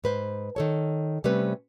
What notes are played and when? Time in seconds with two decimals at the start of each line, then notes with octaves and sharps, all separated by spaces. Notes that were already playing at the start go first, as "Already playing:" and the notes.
0.04 G#2 B4 C5
0.56 D#3 A4 C#5
1.24 C3 G3 A3 C4 C#4 B4